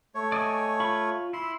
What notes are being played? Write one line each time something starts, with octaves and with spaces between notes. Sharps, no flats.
A3 C#5
D5 D#5 G#5
F4 B5 C#6
E4 C6